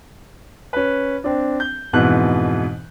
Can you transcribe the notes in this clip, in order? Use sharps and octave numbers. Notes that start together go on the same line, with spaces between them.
C#4 B4
C4 D4
G6
F2 G#2 B2 E3 B3 F#6